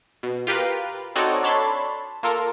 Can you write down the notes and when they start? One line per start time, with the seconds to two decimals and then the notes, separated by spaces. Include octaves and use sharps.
0.23 B2
0.47 F4 G4 A#4 B4 F5
1.15 C4 D#4 F#4 A4 C#5 D5
1.43 D4 A4 C#5 A5 B5 C6
2.23 A#3 F4 A4 A#4